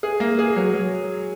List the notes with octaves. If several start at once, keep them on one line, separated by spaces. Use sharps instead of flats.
G#4
A#3
G#4
F#3
F#3